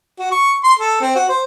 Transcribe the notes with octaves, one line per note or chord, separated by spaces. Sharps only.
F#4
C#6
C6
A4
C4
F#4
C5